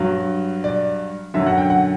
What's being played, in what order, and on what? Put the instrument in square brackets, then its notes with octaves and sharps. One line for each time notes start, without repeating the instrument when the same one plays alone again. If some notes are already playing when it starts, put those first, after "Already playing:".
Already playing: [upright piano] G2 F#3
D5
F#2 D3 F#3 E5
F#5
G5
F#5